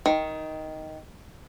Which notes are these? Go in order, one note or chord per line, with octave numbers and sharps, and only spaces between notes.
D#3